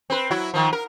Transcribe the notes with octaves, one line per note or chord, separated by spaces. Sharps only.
C4 B4
F#3 E4 F#4
D#3 F3
A#4